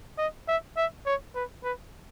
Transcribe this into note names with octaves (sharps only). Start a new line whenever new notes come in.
D#5
E5
E5
C#5
B4
B4